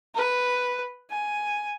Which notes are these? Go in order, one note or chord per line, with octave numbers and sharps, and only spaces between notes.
B4
G#5